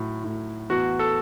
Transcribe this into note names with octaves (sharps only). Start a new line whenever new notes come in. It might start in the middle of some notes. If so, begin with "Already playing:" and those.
Already playing: A2 F#3
A2
E2 F#4
A4